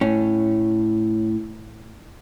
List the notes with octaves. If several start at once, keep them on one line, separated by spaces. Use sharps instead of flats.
A2 C#4